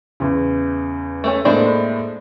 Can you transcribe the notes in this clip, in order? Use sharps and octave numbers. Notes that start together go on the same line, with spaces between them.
E2 C#3
A3 C4 C#4
A2 G#3 A#3 C4 D4